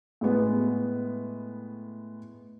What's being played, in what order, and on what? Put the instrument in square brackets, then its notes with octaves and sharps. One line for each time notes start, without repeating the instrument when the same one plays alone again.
[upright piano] A2 G#3 B3